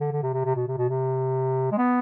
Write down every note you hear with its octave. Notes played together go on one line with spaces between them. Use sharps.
D3
D3
C3
C3
C3
B2
C3
B2
C3
G#3
B3